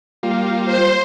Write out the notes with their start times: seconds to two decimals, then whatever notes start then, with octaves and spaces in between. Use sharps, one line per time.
0.23 G3 A#3 F4
0.66 C5